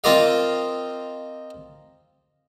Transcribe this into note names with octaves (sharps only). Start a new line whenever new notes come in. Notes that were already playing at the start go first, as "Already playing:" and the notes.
C4 F4 A#4 D5 D#5 F5